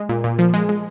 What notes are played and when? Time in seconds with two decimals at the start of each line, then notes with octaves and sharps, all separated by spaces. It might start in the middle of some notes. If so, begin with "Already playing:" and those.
Already playing: G#3
0.09 A#2
0.24 A#2
0.39 F3
0.54 G#3
0.69 G#3